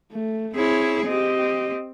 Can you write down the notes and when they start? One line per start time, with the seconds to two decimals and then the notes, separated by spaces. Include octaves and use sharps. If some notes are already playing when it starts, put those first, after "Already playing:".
0.12 A3
0.55 C4 E4 G#4 C#5
1.06 C4 G4 D#5